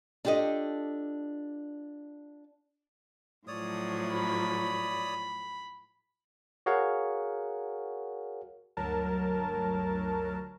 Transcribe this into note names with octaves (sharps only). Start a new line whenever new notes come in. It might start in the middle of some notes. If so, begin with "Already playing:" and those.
D4 F4 G4 A4 D#5
A2 F3 F#3 C#5 D5 D#6
B5
F#4 G#4 A#4 C#5 F5 F#5
G1 D2 F#3 A#4 A5